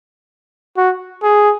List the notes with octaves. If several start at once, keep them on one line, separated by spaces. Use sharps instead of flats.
F#4
G#4